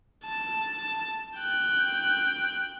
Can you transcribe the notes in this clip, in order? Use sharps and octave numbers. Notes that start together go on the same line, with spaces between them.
A5
G5 F#6